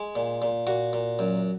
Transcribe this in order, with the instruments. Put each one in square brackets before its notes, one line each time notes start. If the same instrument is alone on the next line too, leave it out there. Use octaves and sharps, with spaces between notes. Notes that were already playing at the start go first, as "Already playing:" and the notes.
Already playing: [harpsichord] G#3
A#2
A#2
A#2 F#4
A#2
F#2